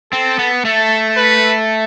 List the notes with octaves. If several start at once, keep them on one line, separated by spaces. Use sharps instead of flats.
C4 A4
B3
A3 A4
B4